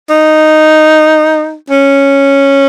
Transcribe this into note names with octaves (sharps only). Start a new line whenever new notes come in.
D#4
C#4